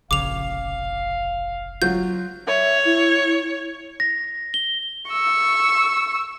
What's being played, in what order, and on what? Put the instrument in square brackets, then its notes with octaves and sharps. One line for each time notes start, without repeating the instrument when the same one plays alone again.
[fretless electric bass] F1 A#1 C#3 [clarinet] F5 [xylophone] D6 F7
[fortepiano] F#3 F4 [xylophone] G6
[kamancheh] C#5 [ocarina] E5
[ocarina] E4
[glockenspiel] A#6
G7
[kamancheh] C#6 E6